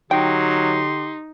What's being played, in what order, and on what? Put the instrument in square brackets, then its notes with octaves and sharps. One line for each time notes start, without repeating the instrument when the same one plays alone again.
[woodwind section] D3 G4 C6 [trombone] F#3 [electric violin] D#4 [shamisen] G5